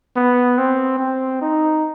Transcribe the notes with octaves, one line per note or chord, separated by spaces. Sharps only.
B3
C4
C4
D#4